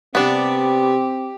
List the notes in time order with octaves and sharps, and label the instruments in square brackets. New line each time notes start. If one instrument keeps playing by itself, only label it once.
[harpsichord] C3 G3 [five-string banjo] B3 D4 [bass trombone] C4 [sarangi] G4